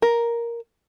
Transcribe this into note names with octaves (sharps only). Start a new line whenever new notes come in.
A#4